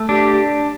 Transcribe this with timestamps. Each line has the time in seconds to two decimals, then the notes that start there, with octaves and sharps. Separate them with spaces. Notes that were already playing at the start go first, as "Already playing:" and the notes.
Already playing: A3
0.09 D4 G4